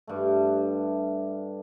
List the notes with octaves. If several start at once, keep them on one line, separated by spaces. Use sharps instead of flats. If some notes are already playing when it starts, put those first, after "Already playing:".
G2 A3